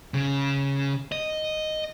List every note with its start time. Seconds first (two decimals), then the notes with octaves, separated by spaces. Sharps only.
0.14 C#3
1.12 D#5